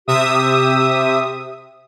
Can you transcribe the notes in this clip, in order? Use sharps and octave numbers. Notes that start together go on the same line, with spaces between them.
C3 G4 E5 D#6